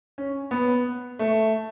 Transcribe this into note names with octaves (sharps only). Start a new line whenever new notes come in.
C#4
B3
A3